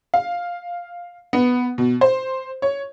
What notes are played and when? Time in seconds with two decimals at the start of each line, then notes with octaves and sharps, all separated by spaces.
0.14 F5
1.33 B3
1.78 B2
2.01 C5
2.62 C#5